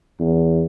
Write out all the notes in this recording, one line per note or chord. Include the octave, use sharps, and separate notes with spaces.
E2